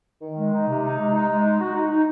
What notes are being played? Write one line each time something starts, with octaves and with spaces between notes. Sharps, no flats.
D#3
G#3
D#4
C3
D#4
G#3
D#4
G#3
D#4
F#4
D#4
D#4